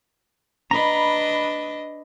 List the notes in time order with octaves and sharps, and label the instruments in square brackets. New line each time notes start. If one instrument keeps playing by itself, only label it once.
[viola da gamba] D4 B4 D#5 [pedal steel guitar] A#5 B5